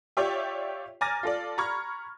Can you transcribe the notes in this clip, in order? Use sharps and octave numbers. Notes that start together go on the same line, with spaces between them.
F4 G4 C#5 D5 E5 G5
G#5 A#5 D6 F6 A6 A#6
F4 A4 D5
A#5 B5 C#6 F6 G#6